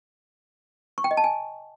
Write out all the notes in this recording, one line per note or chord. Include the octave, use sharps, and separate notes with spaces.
C#6
G5
D#5
A5
G#5